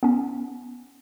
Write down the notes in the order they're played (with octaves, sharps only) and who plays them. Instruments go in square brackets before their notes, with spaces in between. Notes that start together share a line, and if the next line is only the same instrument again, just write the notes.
[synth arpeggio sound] B3 C#4